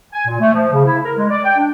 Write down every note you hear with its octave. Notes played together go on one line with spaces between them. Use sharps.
G#5
A#2
A3
F3
C#3
E4
A#4
G#3
D5
G5
D4